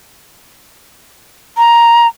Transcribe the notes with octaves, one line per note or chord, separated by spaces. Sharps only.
A#5